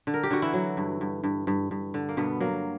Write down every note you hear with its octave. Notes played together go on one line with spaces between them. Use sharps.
D3
A#4
G4
D3 F#4
E3 E4
F#3
G2
G2
G2
G2
G2
D3
A#3
G2 B2 B3
F#3 A#3